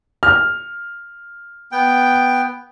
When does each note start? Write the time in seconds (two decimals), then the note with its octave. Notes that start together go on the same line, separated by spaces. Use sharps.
0.23 F6
1.72 B3 G5